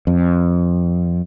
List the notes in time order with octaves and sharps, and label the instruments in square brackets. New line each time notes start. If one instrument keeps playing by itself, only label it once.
[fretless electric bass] F2